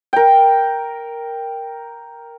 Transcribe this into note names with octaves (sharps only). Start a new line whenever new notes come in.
A#4 G5